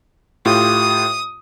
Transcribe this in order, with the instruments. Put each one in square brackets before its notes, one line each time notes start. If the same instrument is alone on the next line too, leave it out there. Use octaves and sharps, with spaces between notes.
[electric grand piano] A2 F4 G4 [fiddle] D#6